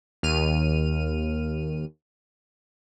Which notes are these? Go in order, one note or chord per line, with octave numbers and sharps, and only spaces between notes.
D#2 F6 D#7